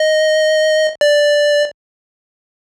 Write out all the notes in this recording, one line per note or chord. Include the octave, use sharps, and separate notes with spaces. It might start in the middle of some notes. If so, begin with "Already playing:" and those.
Already playing: D#5
D5